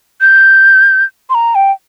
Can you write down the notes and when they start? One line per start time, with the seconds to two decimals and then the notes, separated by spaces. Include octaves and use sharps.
0.21 G6
1.30 C6
1.35 A#5
1.55 G5